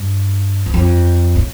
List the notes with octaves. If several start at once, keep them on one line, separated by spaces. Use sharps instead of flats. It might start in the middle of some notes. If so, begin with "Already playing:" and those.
Already playing: G2
E2
F2
A2